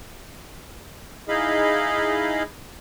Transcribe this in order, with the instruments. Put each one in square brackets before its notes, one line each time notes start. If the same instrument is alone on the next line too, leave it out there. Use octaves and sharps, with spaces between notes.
[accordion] D#4 E4 G#4 D#5 F5 B5